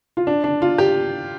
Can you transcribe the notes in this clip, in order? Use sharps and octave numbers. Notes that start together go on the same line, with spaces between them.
F4
D4
D4
F4
G4